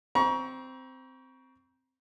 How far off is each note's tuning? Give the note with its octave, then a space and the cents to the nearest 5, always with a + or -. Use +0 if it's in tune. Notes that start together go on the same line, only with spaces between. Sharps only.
C4 -10 A#5 +35 C#6 +25